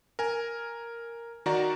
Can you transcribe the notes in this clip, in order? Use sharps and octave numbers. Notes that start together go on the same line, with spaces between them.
A#4 G#5
D#3 F#4 D5 A#5